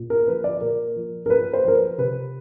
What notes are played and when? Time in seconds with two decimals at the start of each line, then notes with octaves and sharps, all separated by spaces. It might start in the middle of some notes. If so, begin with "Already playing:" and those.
Already playing: A#2
0.10 A#4
0.28 F3 B4
0.44 D5
0.61 A#2 A#4
0.96 F3
1.26 A#4
1.30 A#2 B4
1.53 C5
1.64 F3 A#4
1.76 B4
1.98 C3 B4